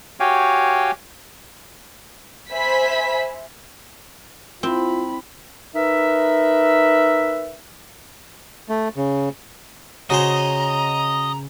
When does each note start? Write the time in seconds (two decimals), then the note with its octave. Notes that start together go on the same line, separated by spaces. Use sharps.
0.20 F#4 G4 C#5 F5 G5 G#5
2.52 C5 E5 G#5 B5 B6
4.63 C4 E4 F4 B5
5.75 D#4 A#4 B4 E5
8.69 A3
8.97 C#3
10.10 C#3 F#4 G#4 C5 D#5 A#5